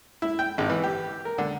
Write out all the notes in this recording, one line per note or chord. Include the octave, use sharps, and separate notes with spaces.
E4
G5
G#1
E3
G4
A#4
D3